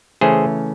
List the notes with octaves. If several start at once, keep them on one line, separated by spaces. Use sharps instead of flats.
C#3 E3 A3 C#4 G#4 C5